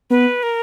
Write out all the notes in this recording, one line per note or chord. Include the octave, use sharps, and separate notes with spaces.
B3 B4
A#4